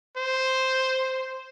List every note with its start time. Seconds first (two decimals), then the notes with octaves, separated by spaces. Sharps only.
0.17 C5